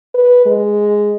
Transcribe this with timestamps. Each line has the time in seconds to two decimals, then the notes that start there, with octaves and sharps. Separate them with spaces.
0.14 B4
0.46 G#3